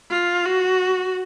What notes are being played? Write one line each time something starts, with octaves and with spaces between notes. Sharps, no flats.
F4
F#4